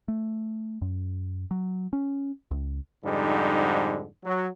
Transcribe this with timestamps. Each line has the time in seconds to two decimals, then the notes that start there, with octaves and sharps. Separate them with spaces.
0.08 A3
0.82 F#2
1.51 F#3
1.93 C#4
2.51 C#2
3.05 F2 G#2 D3 G3 D#4
4.24 F#3